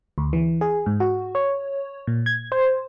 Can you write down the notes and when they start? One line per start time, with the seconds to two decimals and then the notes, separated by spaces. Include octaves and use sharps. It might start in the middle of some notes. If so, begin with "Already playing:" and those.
0.18 D2
0.33 E3
0.61 G#4
0.86 G#2
1.00 F#4
1.35 C#5
2.07 A#2
2.26 G#6
2.52 C5